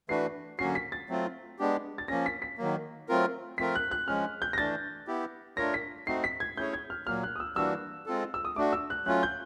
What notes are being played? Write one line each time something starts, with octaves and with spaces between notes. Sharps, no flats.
E3 A3 D4 F#4 B4 C7
D3 F#3 A#3 C#4 F#4 C7
B6
A6
F#3 A3 C4 F4
G#3 B3 D4 G4
A6
F3 A#3 C#4 A#6
B6
B6
D#3 F#3 A#3
F#3 A3 C4 F4 A#4
F3 A3 C4 F4 A#4 B6
F#6
F#6
F3 G#3 C#4 F6
G6
A#6
E3 A3 D4 A6
B3 E4 G4
A3 D4 F4 A#4 C#5 A#6
B6
A3 C4 D#4 F#4 C7
B6
G#6
A3 C#4 E4 G#4 C#5 G6
G#6
F6
A#2 F#3 A#3 F6
F#6
D#6
E6
E3 G3 A#3 D4 F#4 E6
G#3 C4 F4 A4
E6
D#6
A3 D4 F#4 D6
E6
F#6
F#3 A3 C#4 F4 F#6
G6